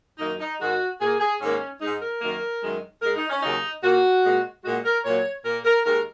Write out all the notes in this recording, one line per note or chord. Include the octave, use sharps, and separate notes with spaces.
F#2 D#3 A#3 D#4
D#4
G#2 D#3 G#3 F#4
A#2 A#3 G#4
G#4
G#2 D#3 A#3 C#4
G#2 G#3 D#4
A#4
F#2 D#3 A#3
F#2 D#3 G#3
G#2 G#3 A#4
D#4
C#4
D#2 C#3 F#3 D#4
A#2 A#3 F#4
A#2 G#3
A#2 G#3 F#4
A#4
A#2 F#3 A#3 C#5
A#2 A#3 A#4
A#4
D#2 D#3 G#3 A#4